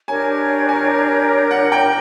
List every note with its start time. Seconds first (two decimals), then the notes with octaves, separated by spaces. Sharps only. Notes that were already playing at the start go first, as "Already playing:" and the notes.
0.08 D4 G4 A#4 C#5 G#5
0.69 G#5
1.51 F#5
1.72 G5